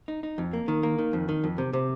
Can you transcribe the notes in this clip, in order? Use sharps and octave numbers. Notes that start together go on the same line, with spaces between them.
D#4
D#4
F2
A#3
D#3
A#3
D#3
F2
D#3
F2
C3
C3